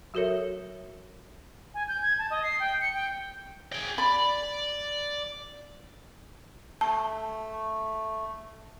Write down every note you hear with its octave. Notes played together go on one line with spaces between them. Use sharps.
F#3 F#4 A4 A#4 C#5 E5
G#5
G6
G#6
A5
D#5
C7
G5
C#7
G5
G#4 G5
D5 B5
A3 A5